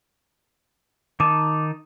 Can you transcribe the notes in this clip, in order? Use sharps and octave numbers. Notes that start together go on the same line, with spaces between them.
D#3 D#4 A5 D6